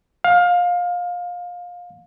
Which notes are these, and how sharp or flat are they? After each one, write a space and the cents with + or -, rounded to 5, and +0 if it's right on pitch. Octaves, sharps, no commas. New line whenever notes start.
F5 +25